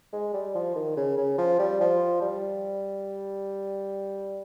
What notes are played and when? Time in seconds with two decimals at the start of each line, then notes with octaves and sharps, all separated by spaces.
0.13 G#3
0.34 G3
0.55 F3
0.76 D#3
0.96 C#3
1.17 C#3
1.38 F3
1.59 G3
1.80 F3
2.22 G3